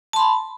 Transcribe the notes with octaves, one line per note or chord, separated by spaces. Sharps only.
A5 B5 C6